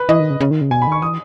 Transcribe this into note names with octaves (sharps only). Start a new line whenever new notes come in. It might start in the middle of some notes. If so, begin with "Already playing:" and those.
Already playing: B4
E3 D#5
D#3
C#3
C#3
D#3
C#3
B2 G#5
B5
D#3 C#6
E3 D#6